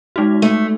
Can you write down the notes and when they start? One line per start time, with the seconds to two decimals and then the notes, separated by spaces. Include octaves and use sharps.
0.16 G#3 D#4 F#4
0.42 A3